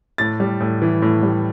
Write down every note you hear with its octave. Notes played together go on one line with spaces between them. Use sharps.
A2 A6
G3
A2
E3
A2
G3